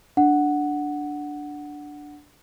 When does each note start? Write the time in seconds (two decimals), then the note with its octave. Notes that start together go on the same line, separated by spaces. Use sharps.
0.17 D4 F#5